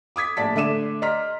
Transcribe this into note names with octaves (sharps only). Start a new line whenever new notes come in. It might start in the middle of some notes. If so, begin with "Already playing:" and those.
D6 D#6 G#6 B6
A#1 A2 D5 A5 B6
D3 A3 D4 D6 D#7 E7
D5 D#5 A#5 C6 F6 B6